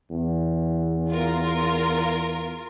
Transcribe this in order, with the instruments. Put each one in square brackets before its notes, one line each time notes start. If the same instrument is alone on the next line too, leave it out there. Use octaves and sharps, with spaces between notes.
[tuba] E2
[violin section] F4 A#4